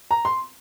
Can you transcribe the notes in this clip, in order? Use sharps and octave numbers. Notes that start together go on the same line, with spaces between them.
A#5
C6